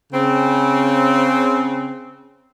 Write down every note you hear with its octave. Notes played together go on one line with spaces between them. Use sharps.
C#3 C4